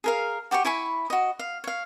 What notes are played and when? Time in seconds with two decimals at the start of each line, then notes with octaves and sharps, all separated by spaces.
0.04 G#4 A#4 F5
0.51 F#4 G4 A5 C#6
0.65 E4 G#5 B5 C#6
1.10 F#4 D#5
1.39 F5
1.64 C#5 F5